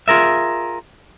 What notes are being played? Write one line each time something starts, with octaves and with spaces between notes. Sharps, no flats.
F4 G#4 A#4 E5